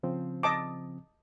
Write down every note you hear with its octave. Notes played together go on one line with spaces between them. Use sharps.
C#3 F3 C4
D#5 A5 D6